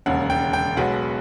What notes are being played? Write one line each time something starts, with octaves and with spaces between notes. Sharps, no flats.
E1 D#2 C#3 F#5
G5
G5
B1 B2 G#3 B3 F#5